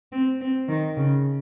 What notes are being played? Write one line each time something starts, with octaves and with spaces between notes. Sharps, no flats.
C4
C4
D#3
C#3